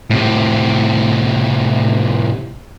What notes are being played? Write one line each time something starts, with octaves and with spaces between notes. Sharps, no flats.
A2 C3